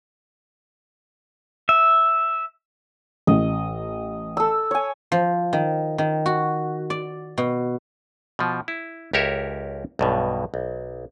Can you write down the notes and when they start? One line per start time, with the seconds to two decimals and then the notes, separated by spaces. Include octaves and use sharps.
1.69 E5
3.27 A1 D#5
4.37 A4 E6
4.71 C#5 G#5
5.12 F3
5.53 D#3
5.98 D#3
6.26 F#4
6.90 D5
7.38 B2
8.39 B2 F3
8.68 E4
9.13 C#2 G4 A#4 C#5 E5
9.99 B1 G2 B2
10.54 B1